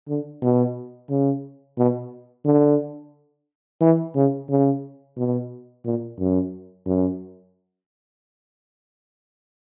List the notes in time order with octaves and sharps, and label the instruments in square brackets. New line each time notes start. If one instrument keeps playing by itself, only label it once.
[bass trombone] D3
B2
C#3
B2
D3
E3
C#3
C#3
B2
A#2
F#2
F#2